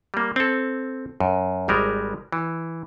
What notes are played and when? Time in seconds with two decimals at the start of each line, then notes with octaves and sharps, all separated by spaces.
0.14 G3 A#3
0.36 C4 A4
1.20 F#2
1.68 G#1 G3 G#3 A#4
2.32 E3